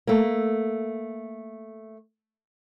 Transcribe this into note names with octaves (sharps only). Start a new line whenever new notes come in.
A3 A#3